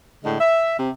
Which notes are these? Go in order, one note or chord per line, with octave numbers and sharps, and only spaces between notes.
A2 D3 G#3
E5
C3